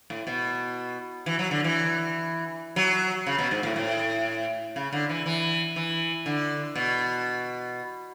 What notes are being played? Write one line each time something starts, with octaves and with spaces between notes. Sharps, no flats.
A2
B2
E3
F#3
D3
E3
F#3
C#3
B2
G#2
A2
A2
C#3
D3
E3
E3
E3
D3
B2